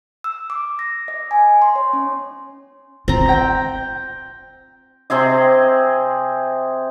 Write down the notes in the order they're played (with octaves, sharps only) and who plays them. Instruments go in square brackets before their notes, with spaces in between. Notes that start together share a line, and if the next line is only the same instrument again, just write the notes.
[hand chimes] E6
D6
A#6
D#5
G#5
C6
C#5
C#4
[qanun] C4 A#5 [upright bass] F4
[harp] G5 A#6
[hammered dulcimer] C3 C4 G#4 D#5